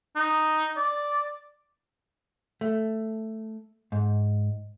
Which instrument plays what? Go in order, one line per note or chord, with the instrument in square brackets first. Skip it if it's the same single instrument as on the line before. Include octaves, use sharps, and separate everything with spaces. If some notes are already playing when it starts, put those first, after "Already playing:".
[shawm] D#4
D5
[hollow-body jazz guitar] A3
G#2